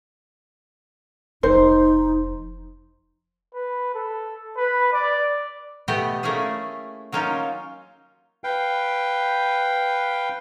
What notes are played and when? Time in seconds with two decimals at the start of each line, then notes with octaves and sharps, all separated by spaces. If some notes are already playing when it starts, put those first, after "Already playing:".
1.43 F1 F3 D#4 C5
3.55 B4
3.95 A4
4.57 B4
4.93 D5
5.88 B2 A3 B3 G4 D#5
6.23 A3 A#3 C#4 E4 G#4
7.12 F#3 A#3 C#4 D#4 F4
8.44 B4 F5 G5